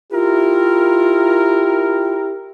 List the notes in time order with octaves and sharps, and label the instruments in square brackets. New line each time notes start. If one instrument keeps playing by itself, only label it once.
[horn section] E4 A#4 [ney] F4 [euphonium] G4